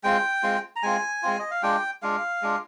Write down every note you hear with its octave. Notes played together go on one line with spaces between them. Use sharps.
G#3 C4 F4 G5
G#3 C4 F4
A#5
G#3 C4 F4 G#5
G#3 C4 F4
D#5
F5
G#3 D4 F4 G5
G#3 D4 F4 F5
G#3 D4 F4